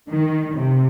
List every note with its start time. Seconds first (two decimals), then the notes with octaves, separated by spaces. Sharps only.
0.10 D#3
0.57 C3